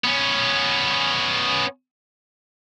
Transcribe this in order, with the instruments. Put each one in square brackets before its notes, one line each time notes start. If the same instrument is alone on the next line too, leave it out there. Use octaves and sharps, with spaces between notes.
[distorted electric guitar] B3 C#4